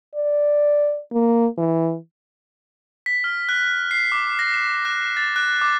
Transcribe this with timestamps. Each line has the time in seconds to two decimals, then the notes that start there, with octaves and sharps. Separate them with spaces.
0.15 D5
1.13 A#3
1.58 E3
3.06 B6
3.24 F6
3.49 F#6
3.91 C7
4.12 D6
4.39 A#6
4.54 E7
4.85 F#6
5.17 A6
5.36 F#6
5.62 D6